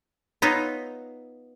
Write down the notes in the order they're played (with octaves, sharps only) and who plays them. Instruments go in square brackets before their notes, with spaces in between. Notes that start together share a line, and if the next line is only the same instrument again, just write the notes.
[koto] B3 D#4 F4 C#5 E5